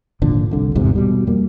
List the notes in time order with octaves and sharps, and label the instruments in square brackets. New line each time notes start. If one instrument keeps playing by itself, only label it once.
[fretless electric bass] G#1 A#2 D3 F3
C2 D3
G1 E2 G#2 C3
B2 G3
F2 G3 A#3